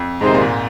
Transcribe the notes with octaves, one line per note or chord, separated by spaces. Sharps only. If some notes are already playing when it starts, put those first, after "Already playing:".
Already playing: F2
G#2 C3 D#3 G#3 D#4 C5
A#2
G#2